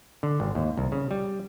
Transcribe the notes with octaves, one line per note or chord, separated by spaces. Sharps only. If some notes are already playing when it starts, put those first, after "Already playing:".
D3
G#1
D#2
C2
C#3
G3